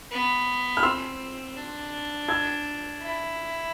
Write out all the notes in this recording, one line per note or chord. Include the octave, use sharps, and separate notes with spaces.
B3
F6
C4 C6 E6
D4
E6 G#6
E4